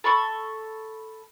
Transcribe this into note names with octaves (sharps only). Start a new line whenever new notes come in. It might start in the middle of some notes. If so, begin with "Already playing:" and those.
A4 B5 C#6